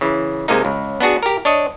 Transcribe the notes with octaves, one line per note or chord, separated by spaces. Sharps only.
C#3 E3
C3 G#3 A#3 D#4
C#2
B3 D4 F#4 G#4
G4 A#4
D4 C#5 D#5